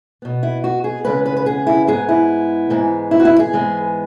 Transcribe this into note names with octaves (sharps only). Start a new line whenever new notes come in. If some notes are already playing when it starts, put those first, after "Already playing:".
B2 B3
E4
F#4
G#4
E2 C#3 G#3 B3 B4
B4
B4
G#4
E4
G#2 G#3 B3 G#4
E4
G#2 E3 G#3 B3
E4
F#4
E4
G#4
G#2 E3 G#3 B3